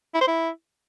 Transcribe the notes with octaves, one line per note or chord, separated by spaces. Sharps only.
E4
C5
E4